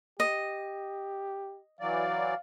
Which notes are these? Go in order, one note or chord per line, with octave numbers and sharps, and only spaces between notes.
G4 D#5
E3 F#3 D5 F5